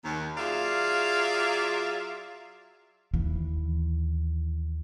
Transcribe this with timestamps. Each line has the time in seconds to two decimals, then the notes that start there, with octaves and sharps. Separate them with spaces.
0.04 D#2
0.37 F#3 F4 G#4 D5 E5 F5
3.14 D#2 E3